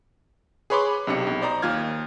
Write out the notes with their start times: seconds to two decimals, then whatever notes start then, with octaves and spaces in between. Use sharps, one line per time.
0.70 G#4 B4 C#5 B5 C6 D6
1.07 B1 C3 D4 C#7
1.27 B1
1.42 C5 D5 D#5 A#5
1.62 D#2 F4 F6 G#6